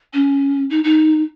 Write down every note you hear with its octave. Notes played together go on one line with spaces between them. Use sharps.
C#4
D#4
D#4